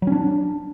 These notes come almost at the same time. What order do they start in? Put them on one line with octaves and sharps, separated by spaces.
F#3 C#4 D4